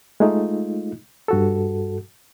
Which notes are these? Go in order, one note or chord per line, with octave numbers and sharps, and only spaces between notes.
G#3 A3 D#4 F4
G2 F#4 A4